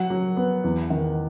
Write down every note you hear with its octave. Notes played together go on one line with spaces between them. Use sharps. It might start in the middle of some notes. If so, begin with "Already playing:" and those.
Already playing: F#3 F#5
F#3
B3
E2
D#3